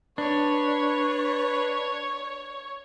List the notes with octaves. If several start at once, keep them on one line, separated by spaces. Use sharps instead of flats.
D4 B4 C#5